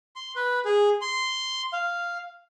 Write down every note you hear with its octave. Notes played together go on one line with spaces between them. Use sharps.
C6
B4
G#4
C6
F5